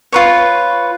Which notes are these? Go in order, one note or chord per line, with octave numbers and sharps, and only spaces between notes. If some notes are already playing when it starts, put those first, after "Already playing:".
F4 B4 C#5